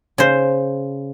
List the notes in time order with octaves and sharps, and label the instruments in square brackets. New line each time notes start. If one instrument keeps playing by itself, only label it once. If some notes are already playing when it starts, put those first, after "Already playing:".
[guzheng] C#3 C5